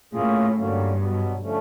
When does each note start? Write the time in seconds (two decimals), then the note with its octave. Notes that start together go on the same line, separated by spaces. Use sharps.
0.13 A2 A#3 C#4 F4 G#4
0.56 G2 D3 F#3 A#3 C#4
0.98 B2 F#3 B3
1.42 D3 F3 A3 C#4